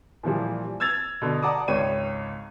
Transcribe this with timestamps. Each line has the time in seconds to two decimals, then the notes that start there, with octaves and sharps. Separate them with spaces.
0.23 A#2 E3 F3 G3
0.80 E6 G#6 A6 F7
1.22 B2 D3
1.42 D5 F#5 A5 A#5 D6 D#6
1.68 G#1 C#2 C#5 G5 D#7